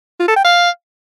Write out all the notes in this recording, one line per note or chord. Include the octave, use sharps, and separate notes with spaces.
F4
A4
G5
F5